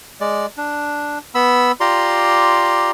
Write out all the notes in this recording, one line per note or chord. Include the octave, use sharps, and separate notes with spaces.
G#3 D5
D4
B3 B5 E6
F4 G4 D5 A#5 C6